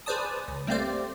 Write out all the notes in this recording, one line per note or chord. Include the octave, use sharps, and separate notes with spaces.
G#4 B4 C5 D5 A5 D#6
C#2
G3 A3 A#3 C4 C5 D5